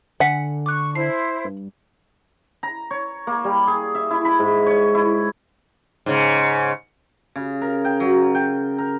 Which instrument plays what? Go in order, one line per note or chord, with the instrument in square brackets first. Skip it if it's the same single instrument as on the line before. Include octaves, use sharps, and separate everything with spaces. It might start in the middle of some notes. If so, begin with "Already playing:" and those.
[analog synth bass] D3 [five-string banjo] F#5 [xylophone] G#5 B6 C#7
[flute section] C#6 [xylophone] D6 F#6
[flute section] E4 C5 [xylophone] A5 C7
[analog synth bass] G2
[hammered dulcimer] A#5
C#5
A#3
G3
G#4
E5
E4
B5
G#2
C#5
E4
[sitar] G#2 C#3
[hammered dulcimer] C#3
A#4
G5
F#3
G5
A#4